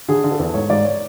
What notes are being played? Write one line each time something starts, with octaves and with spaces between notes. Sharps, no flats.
D3 G#4
D3
A4
E2
G#2 C#5
G#2 D5
C#5